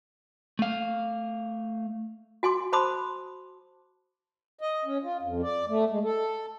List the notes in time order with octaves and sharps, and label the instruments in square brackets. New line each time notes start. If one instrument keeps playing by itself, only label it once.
[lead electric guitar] A3 F5
[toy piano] F#4 G#5 C6 D6
C5 A5 B5 C6 D6 D#6
[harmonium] D#5
C#4
F4
F2
D5
A3
G#3
A4